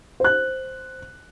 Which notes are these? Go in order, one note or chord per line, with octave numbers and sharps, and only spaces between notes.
C5 F#6